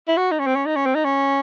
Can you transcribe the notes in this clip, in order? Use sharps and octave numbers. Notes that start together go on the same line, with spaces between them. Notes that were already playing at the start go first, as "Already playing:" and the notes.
E4
F#4
D#4
C#4
C4
C#4
D#4
C#4
C4
D#4
C#4